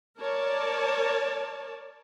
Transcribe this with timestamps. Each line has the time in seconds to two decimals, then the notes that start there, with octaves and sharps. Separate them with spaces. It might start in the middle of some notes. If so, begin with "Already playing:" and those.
0.19 A#4 C#5 D5 A5